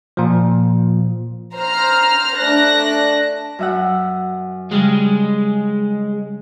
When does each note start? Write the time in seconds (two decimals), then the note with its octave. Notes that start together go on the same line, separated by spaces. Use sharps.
0.17 A#2 F3
1.55 C5 A#5 F6
2.37 A3 D4 F#6 A#6
3.59 F#2 E5 F#5
4.72 C#3 G3 G#3